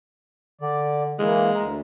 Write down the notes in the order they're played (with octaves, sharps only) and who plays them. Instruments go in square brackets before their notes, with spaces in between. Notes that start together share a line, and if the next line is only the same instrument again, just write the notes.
[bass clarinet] D3 [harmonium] D5
[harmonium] E3 A#3 [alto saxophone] G#3
[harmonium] D2 [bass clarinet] A#4